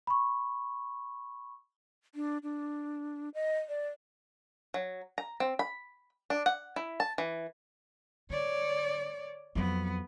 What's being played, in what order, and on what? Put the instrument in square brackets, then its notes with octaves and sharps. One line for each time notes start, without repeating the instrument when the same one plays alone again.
[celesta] B5 C#6
[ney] D4
D4
D#5
D5
[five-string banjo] F#3
A#5
C4
B5
D4
F#5
E4
A5
E3
[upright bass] D3 [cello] C#5 D5
[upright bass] F2 F#3 [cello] B3